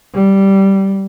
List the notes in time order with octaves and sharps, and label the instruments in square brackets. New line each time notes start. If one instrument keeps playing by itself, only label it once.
[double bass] G3